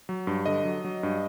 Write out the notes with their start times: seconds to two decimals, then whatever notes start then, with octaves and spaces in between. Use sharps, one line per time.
0.09 F#3
0.27 G2
0.46 D3 D#5
0.65 F#3
0.84 F#3
1.03 G2